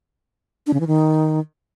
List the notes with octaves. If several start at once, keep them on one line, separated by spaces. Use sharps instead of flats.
D4
C#3
E3
D#3